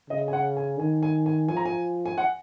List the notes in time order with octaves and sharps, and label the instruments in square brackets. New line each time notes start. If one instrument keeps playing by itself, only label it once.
[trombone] C#3 [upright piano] D#5
[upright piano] G#5
F#5
G#5
[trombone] D#3 [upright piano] G#5
[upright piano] G#5
G#5
[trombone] F3 [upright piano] G#5
[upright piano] A#5
G#5
G#5
F#5